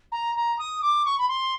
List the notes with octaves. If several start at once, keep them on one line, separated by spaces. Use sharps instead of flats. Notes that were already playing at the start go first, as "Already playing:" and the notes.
A#5
A#5
D#6
D6
C#6
B5
C6